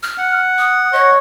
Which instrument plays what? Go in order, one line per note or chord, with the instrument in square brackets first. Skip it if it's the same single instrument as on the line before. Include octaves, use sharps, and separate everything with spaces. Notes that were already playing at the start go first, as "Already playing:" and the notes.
[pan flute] F6
[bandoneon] F#5
[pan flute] D#6
[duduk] C#5 [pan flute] D#5